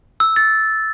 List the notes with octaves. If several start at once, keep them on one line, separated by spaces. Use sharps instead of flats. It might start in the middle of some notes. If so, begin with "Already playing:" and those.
E6
A6